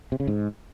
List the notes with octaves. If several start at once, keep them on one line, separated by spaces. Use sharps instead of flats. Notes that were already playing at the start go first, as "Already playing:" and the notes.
C3
C#3
G#2